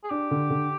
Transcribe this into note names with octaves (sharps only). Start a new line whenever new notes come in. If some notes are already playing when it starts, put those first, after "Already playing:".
G#4
D4 G4
D3
D3